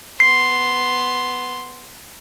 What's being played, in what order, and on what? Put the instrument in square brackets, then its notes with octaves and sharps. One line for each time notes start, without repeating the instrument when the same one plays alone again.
[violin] B3 C6 [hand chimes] C7